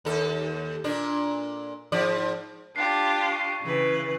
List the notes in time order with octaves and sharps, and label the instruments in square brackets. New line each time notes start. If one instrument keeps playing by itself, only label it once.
[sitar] D#2 A4
A#2 D4
G#2 F3 D5
[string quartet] D4 F4 G4 [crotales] C7
[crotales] C#6 C7
[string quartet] C#3 E3 B4